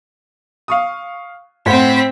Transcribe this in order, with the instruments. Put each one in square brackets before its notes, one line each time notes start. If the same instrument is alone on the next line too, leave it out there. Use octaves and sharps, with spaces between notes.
[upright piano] F5 C#6 D#6
[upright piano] A2 C5 F#5 [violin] C4 B6